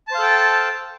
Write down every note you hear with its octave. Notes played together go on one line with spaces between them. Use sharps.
A4 C5 F5 G5 A5